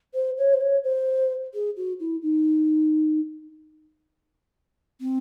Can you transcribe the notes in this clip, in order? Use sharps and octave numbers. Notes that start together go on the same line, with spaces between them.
C5
C#5
C5
C#5
C5
G#4
F#4
E4
D#4
C4